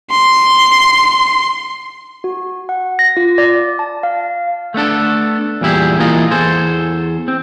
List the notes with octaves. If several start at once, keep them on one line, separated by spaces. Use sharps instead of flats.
C6
F#4
F#5
A#6
F4
D5
A5
F5
A3 B3 D4 A4
E2 A#2 G3 E4 G4 G#4
E3 A#3 E4 F4 D#5
E2 G#4 A4 C5
C4